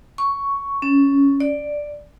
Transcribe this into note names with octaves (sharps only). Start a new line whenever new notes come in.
C#6
C#4
D5